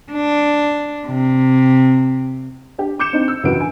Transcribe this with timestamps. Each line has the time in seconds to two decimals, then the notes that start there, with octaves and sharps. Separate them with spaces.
0.12 D4
1.07 C3
2.78 D4 G4
2.99 D6 G6 C#7 E7
3.13 C4 D4 D#4
3.28 E6
3.43 C#2 F#2 E3 F#4 B4 D7
3.56 G2 G#5